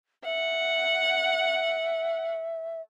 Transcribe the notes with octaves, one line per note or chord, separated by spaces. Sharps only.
E5 F#5